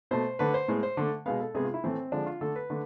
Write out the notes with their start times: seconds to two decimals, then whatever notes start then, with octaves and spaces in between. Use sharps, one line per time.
0.11 B2 A3 C5
0.39 D3 A3 B4
0.54 C5
0.68 A2 G#3 B3
0.83 C5
0.97 D3 A3
1.26 B2 G#3 B3 F5
1.40 A4
1.55 C3 G#3 B3 G#4
1.64 F4
1.74 E4
1.84 A2 E3 A3 C4
2.12 D3 F3 G#3 D4
2.26 F4
2.41 D3 A3 A4
2.56 B4
2.70 D3 A3